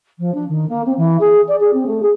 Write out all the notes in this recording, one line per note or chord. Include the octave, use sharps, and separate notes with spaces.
F3
D4
D#3
A#3
C4
E3
G#4
D5
G#4
C4
A3
G#4